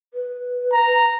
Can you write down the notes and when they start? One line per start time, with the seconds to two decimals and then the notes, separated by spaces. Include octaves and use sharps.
0.13 B4
0.73 A#5